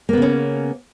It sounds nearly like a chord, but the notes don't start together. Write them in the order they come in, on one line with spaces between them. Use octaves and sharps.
A#3 B3 C#3 C#4